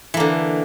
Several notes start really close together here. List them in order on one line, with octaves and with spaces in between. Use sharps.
E3 A#3 D3